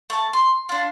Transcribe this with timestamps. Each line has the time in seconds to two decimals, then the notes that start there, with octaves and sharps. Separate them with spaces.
0.10 A3 A5
0.33 C6
0.69 D4 F4